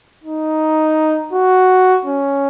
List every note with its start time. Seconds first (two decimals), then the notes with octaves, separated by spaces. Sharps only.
0.24 D#4
1.33 F#4
2.05 C#4